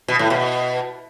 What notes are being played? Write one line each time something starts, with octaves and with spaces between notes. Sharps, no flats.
B2
A2
B2